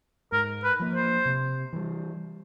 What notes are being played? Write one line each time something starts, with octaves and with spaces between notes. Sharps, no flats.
G#2 A#4
B4
F3 A#3
C5
C3
E3 G3